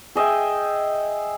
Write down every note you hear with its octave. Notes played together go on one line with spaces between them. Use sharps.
G#4 D#5 E5 G5